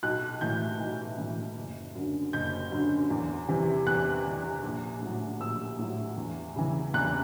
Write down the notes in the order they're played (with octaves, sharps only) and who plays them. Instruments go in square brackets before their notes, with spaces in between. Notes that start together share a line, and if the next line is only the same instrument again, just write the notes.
[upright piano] B1 F#6
A2 E3 G6
B1
A2 E3
F#1
F#2 D3
F#1 G6
F#2 D3
E2
C3 E3
E2 F#6
C3 E3
A#1
A2 F#3
A#1 E6
A2 F#3
E2
C#3 E3
E2 F#6